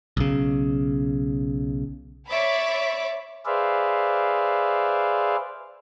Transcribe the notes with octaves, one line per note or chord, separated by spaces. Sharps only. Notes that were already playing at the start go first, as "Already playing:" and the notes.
B1 C#3
C#5 D5 E5 B5 D6
G#4 B4 C5 D5 E5 F5